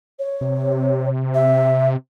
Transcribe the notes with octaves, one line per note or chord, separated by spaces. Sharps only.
C#5
C3
E5